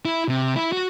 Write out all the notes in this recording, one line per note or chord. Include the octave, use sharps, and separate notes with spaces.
E4
C3
E4
F#4